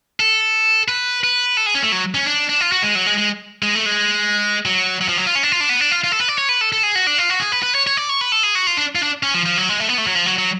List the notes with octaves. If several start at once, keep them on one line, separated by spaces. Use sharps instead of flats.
A4
B4
B4
A4
G#4
C#4
A3
F#3
C#4
D4
D4
F4
F#4
G#3
F#3
G#3
G#3
G#3
A3
G#3
F#3
F#3
F3
F#3
F4
C#4
D4
F4
D4
B3
D4
F4
F4
A4
B4
D5
C#5
B4
A4
A4
G#4
F#4
D4
F4
F#4
G#4
B4
B4
C#5
C#5
D5
C#5
B4
A4
G#4
F#4
F4
D4
F4
D4
C#4
F3
F3
F#3
G#3
A3
B3
A3
F#3
F3
F#3
F#3